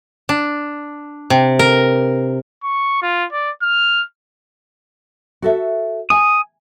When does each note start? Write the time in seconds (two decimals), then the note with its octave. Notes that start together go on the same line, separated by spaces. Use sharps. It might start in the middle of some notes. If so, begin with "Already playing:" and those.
0.29 D4
1.30 C3
1.59 A#4
2.64 C#6
3.02 F4
3.33 D5
3.62 F6
5.42 F#4 A4 E5
6.10 G#5 D#6